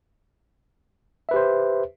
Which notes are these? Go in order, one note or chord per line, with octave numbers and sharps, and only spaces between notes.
G4 B4 C5 E5